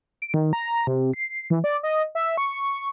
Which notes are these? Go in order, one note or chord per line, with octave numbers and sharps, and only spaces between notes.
D7
D#3
A#5
C3
C7
E3
D5
D#5
E5
C#6